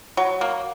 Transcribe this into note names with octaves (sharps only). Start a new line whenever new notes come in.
F#3
A#3